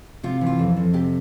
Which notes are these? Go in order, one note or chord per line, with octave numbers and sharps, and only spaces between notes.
C3 F4
E3
F4
F2
F2
C3 G4